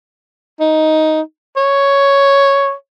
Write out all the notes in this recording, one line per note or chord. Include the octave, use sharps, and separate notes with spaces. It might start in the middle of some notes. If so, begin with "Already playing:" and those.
D#4
C#5